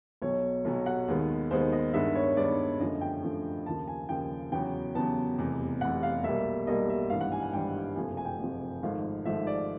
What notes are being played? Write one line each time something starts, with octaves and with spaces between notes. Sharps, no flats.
B1 B2 F#3 C#5
B1 B2 F#3
F#5
D#2 D#3 G#3 B3
D#2 D#3 G#3 B3 C5
D#5
G2 D#3 G#3 B3 E5
C#5
G2 D#3 G#3 B3 D5
F#2 D3 F3 A3 D#5
G5
F#2 D3 F3 A3
D#2 C#3 F3 A5
G#5
D#2 C#3 F3 G5
E2 C#3 F#3 B3 G5
E2 C#3 F#3 B3 A5
F1 E2 C3
F1 E2 C3 F#5
F5
B1 B2 G3 A#3 E5
B1 B2 G3 A#3 D#5
E5
G#1 G2 E3 G3 F5
F#5
G#5
G#5
G#1 G2 E3 G3 G5
F#1 F2 C3 F3 A3 G#5
G#5
G5
F#1 F2 C3 F3 A3
G#1 G#2 F3 A3 F5
G#1 G#2 F3 A3 E5
D5